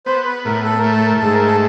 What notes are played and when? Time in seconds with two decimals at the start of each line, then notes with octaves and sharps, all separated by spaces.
0.06 B3 C5
0.25 B4
0.45 A2 A#4
0.64 A4
0.78 A#4
0.84 A3
0.92 A4
1.05 A#4
1.19 G#2 A4
1.33 A#4
1.46 A4